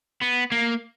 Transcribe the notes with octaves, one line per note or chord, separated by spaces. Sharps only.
B3
A#3